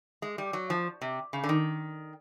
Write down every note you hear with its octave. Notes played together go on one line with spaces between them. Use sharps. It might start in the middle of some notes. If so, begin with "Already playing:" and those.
G#3
G3
F#3
F3
C3
C#3
D3
D#3